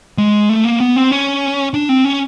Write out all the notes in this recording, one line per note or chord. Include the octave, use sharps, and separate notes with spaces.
G#3
A3
A#3
B3
C4
C#4
D4
C4
C#4